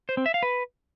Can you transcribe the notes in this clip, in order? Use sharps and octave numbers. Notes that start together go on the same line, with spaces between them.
C5
C4
E5
F5
B4